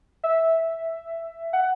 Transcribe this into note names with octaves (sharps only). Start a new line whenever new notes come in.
E5
F#5